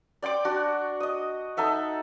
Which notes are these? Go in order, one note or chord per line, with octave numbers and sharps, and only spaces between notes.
D5 G5 C6 D6
D4 F#4
D#5 D#6
D#4 A4 E5 F#5